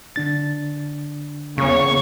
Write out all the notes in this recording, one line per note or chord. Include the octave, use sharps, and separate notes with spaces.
D3 D4 A6
E2 C#3 A#3 C#5 C#6